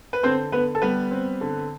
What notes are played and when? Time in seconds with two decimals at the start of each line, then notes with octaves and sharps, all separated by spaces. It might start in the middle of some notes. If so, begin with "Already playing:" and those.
0.13 B4
0.23 D3 C4 C5
0.52 D3 B3 B4
0.75 A4
0.82 G3 B3 B4
1.11 C4
1.41 D3